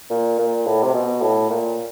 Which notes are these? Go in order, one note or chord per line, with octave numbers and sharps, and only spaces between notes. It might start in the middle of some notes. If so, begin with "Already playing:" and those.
A#2
A#2
A2
C3
B2
A2
A#2